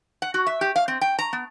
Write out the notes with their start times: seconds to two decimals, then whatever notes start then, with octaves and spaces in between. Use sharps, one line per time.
0.22 F#5
0.34 F#4
0.47 E5
0.61 G4
0.76 F5
0.88 C4
1.01 G5
1.19 A#5
1.33 B3